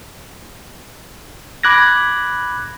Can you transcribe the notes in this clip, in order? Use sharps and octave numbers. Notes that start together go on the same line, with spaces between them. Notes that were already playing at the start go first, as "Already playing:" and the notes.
B5 D6 F#6 G#6 A#6